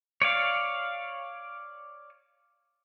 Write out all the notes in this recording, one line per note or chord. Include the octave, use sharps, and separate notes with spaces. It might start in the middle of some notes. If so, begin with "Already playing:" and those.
C#5 D5 F5